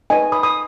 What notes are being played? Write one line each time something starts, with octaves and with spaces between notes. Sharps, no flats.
D#4 B4 D#5 G#5
B5 D#6
B5 D#6